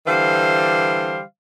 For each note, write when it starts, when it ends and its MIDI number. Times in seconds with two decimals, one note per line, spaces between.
0.07 1.22 50
0.07 1.22 52
0.07 1.22 55
0.07 1.22 72
0.07 1.22 77